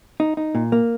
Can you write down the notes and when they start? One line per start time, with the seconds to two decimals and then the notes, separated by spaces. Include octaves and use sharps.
0.20 D#4
0.37 D#4
0.55 A#2
0.72 A#3